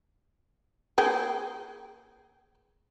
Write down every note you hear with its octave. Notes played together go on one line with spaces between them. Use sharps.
A#3 G#4 G5